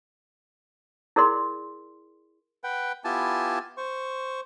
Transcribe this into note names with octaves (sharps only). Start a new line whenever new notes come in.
E4 G#4 A#4 D5 C6
B4 F#5 G5
B3 E4 F4 G4 G#5 A5
C5 C#6